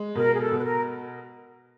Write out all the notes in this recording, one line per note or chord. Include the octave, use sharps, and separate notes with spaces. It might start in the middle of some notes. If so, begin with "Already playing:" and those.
Already playing: G#3
B2 A#4
G#4
A4
B2
B4
A#4